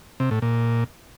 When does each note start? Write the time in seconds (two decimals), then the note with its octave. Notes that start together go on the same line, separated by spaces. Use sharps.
0.20 C3
0.31 A2
0.42 A#2